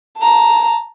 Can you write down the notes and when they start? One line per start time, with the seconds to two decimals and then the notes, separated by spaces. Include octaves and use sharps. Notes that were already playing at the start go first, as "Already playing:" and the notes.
0.18 A5 A#5